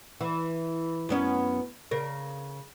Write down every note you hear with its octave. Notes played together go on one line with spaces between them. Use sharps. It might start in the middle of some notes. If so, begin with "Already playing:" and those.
E3
F#2 B3 C#4
C#3 A#4